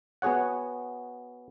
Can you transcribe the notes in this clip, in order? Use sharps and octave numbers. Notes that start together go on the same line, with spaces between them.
B3 F#4 G#4 C#5 F#5